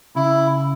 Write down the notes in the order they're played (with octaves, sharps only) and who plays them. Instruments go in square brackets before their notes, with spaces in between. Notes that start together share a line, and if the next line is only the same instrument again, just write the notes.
[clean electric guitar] C#3 [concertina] E4